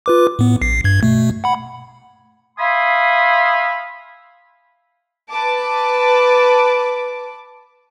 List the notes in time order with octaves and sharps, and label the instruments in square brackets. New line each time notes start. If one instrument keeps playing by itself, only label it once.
[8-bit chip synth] F4 B4 D6
A2 B3
A#1 C7
G2 G#6
B2 A3
F#5 B5
[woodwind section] E5 F5 G#5 B5 C6 D#6
[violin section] B4 A5 D6